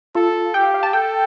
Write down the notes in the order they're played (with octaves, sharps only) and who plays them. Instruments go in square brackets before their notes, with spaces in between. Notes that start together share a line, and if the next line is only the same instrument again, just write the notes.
[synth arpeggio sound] F4 [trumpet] A4
[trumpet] G4 [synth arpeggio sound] G5
[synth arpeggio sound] F5
F5
A5
[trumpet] A4 [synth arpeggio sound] G5